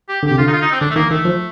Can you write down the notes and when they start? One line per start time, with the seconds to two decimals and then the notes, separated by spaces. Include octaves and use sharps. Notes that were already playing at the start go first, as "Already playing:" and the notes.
0.09 G4
0.23 D3
0.27 C3 G4
0.38 D3 F4
0.48 D#4
0.53 F4
0.62 D#4
0.72 C4
0.81 D3 D4
0.90 A3
0.96 D#3 A#3
1.10 D#3 A3
1.25 F3